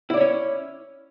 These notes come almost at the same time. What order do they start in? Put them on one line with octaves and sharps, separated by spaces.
E4 D5 C#5 C#4